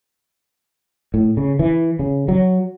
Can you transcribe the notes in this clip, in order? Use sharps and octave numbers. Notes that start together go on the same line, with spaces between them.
A2
C#3
E3
C#3
F#3